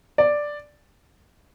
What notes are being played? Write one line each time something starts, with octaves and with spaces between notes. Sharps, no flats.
D5